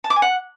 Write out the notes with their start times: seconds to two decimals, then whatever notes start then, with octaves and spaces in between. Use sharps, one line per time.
0.04 A5
0.10 D6
0.16 G#5
0.22 F#5